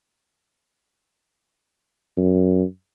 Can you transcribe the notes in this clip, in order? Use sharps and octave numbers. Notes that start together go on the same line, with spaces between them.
F#2